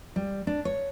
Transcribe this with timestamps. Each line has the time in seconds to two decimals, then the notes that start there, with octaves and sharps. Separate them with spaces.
0.16 G3
0.47 D4
0.65 C#5